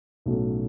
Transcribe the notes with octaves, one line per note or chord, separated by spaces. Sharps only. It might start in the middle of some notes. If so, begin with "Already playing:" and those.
B1 A2 F#3 A3 C#4